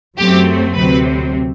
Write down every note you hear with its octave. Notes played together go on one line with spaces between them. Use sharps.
F#2 F#3 A3 C4 G4
D2 C3 F#3 C4 B4